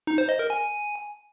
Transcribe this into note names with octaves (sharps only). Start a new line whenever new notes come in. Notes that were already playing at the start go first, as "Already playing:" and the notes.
D#4
C5
D#5
A#4
G#5